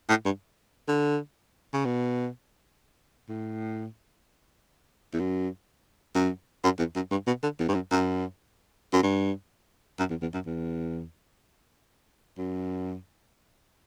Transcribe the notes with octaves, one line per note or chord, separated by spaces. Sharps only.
A2
G2
D3
C#3
B2
A2
E2
F#2
F#2
F#2
E2
F#2
G2
B2
D3
E2
G2
F#2
F#2
F#2
G2
F#2
E2
E2
F#2
E2
F#2